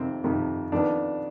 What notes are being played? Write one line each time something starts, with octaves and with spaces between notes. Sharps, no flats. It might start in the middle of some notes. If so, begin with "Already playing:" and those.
Already playing: F2 C3 D#3 C4
F2 C3 D#3
F2 D#3 B3 D4